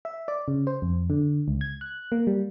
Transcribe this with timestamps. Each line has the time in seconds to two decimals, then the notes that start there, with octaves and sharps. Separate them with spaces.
0.05 E5
0.28 D5
0.48 C#3
0.67 C5
0.82 F2
1.10 D3
1.48 C#2
1.61 G#6
1.81 F#6
2.12 A#3
2.27 G3